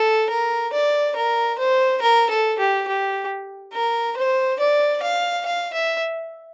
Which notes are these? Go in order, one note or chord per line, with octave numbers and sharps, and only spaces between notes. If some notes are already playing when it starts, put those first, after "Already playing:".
Already playing: A4
A#4
D5
A#4
C5
A#4
A4
G4
G4
A#4
C5
D5
F5
F5
E5